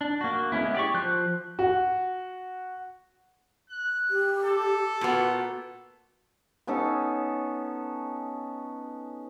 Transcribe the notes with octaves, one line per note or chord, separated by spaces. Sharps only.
D4
A#3 F#4
G#3 B3 C#4 E4
G4 D5 C#6
F3 C5 F#6
F#4
F#6
G4
A4
A#2 B3 F#4
B3 C#4 D#4 A4